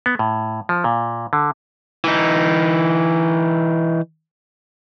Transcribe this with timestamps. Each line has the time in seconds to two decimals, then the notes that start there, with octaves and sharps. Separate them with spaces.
0.06 B3
0.19 A2
0.69 F3
0.84 A#2
1.33 D3
2.04 E3 D#4